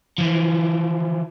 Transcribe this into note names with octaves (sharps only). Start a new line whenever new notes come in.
E3 F3